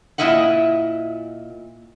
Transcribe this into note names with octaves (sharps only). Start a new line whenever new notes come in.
A#2 A#3 E4 D#5 E5 F#5